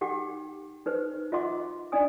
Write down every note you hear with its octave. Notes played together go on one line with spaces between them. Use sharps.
D#4 G4 F#5 G5 D6
D#4 B4 C5
F4 D#5 E5 F#5 C6 D6
D4 D#4 D5 D#5 G#5 D#6